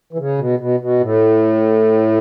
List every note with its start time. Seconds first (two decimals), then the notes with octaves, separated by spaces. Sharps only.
0.13 E3
0.18 C#3
0.38 B2
0.59 B2
0.80 B2
1.01 A2